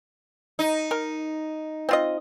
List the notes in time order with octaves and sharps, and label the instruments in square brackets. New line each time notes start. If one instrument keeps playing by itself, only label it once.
[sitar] D#4
[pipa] A#4
C4 F4 D#5